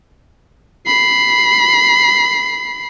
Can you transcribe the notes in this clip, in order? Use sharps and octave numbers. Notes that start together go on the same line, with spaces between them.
B5 C7